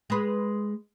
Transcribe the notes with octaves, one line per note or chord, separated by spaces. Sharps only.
G#3 B4